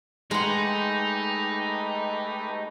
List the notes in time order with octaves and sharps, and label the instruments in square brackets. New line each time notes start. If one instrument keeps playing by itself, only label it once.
[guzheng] G#3 F#5 [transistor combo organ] A3 G4 B4 [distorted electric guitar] D#4